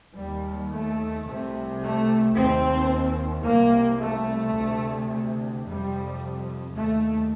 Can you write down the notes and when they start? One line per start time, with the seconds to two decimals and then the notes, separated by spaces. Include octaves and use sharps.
0.16 D#2 G3
0.72 A3
1.26 C2 C3
1.81 A3
2.35 D#2 C4
3.45 C2 C3 A#3
4.00 A3
4.55 D2 C3
5.65 F2 C3 G3
6.74 D#2 A3